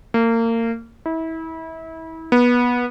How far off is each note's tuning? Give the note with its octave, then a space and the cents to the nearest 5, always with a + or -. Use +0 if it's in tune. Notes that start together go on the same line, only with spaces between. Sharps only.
A#3 -30
E4 -30
B3 -20